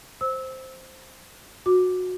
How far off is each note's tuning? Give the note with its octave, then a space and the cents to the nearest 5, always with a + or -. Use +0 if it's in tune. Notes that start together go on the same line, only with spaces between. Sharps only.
C5 +0 E6 -20
F#4 -20 D6 +0